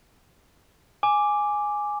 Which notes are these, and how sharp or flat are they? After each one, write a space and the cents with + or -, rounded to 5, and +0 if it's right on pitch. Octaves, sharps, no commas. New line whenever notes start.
G#5 +0 D6 +0